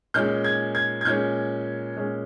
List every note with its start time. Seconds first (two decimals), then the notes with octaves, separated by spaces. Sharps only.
0.14 A#2 G#3 C#4 G6
0.44 G#6
0.75 G#6
1.01 G#6
1.05 A#2 G#3 C#4 G6
1.96 A#2 G#3 C#4